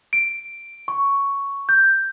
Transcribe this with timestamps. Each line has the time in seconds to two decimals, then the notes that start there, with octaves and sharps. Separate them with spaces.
0.13 D7
0.88 C#6
1.69 G6